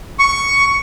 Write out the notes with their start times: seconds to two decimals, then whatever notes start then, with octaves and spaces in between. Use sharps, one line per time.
0.19 C#6